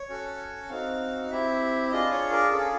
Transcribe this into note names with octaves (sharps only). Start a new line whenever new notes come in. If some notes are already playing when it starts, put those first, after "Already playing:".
Already playing: C#5
C#4 F#4 A4
C4 D#4 F#4 F5
C4 E4 G4 E5
D4 F4 G#4 D#5
C#5
A#4
C#4 F4 G#4 A4